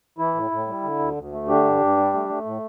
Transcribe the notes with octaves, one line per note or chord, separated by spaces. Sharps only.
E3 E4
A2
A2
G3
D3
D2
D2
A3
D3 D4 G4
G2
G2
G3
A3
A3
A2